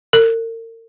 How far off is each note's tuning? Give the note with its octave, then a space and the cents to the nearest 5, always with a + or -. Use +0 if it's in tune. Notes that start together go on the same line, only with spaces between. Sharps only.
A#4 -40